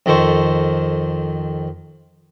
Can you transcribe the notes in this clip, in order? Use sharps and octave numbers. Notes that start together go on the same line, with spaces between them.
F2 D#3 A4 C5 C#6